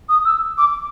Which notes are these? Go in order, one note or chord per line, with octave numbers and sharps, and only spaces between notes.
D#6
E6
D6